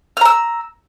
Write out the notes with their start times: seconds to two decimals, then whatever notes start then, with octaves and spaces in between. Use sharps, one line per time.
0.17 F6
0.21 A#5
0.25 E6